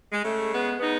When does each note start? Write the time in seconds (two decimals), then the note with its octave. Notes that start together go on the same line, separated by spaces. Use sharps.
0.12 G#3
0.24 C#3 G#3 A3
0.52 G#3 B3
0.79 C#3 G#3 B3 D#4